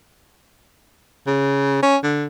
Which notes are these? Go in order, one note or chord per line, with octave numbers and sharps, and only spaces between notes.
C#3
C#4
D3